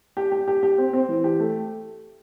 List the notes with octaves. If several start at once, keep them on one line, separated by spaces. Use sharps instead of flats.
G4
G4
G4
G4
C4
C4
E3
G4
A3